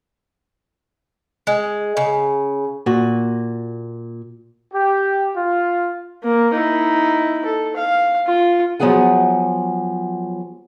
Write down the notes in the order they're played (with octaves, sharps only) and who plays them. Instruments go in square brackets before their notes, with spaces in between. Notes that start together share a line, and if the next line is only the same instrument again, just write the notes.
[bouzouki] G#3
C#3
[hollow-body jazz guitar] A#2 F#4
[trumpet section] G4
F4
[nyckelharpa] A#3
D#4 E4
A4
F5
F4
[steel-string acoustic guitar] F3 F#3 B3 G#4 F#5 G#5